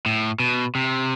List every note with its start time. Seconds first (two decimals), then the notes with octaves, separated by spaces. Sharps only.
0.06 A2
0.40 B2
0.75 C3